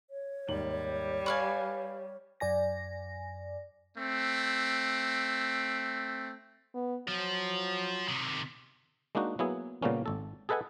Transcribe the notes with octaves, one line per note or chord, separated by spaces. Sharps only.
C#5
D#2 G#2 G3 F#7
B4 F5 G#5 C#6 F6
F#2 D5 G#5 A#6
A3 C4
B3
F3 F#3
C3 D#3
G#3 A#3 D4 D#4 F#4
F#3 A#3 B3 E4 G#4
A#2 C#3 G3 A#3 B3 C#4
G#1 A4
G#4 A4 B4 D#5 F#5 G#5